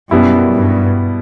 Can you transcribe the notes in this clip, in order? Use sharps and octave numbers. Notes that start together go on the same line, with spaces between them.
F#2 B2 G3 B3 E4
G2